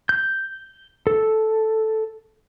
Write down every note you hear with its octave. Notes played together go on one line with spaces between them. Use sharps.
G6
A4